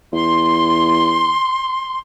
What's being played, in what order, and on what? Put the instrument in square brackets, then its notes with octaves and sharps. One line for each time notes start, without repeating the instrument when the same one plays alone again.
[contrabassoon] E2 [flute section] C6